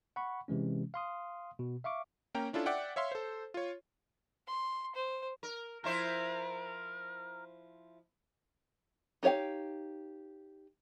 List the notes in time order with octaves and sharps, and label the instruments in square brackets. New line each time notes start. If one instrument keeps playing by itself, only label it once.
[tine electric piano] F#5 B5 C#6
C3 E3 G#3 C#4
F5 C6 D#6
B2
E5 F5 C#6 D6
[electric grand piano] A#3 C#4 G5 A#5
C#4 D4 E4 F4 A4
D5 E5 F#5 G5
C#5 E5 F5 C6
A4 C5
F4 C#5
[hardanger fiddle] C6
C5
[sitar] A#4
[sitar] F3 E4 C5 [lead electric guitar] A#4
[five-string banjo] D#4 G4 C#5 F5 G5